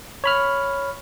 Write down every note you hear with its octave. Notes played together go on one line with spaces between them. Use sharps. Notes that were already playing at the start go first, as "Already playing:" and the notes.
C#5 B5 F6